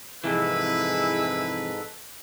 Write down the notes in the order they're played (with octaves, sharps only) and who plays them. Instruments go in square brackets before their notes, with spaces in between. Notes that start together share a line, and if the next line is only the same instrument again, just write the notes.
[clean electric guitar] F2 C3 E3 [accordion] G#2 A4 [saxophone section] G#3 E4 [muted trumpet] B4